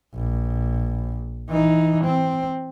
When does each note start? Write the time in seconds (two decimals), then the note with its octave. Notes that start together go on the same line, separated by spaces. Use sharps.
0.15 A#1
1.49 E3 D#4
2.04 C4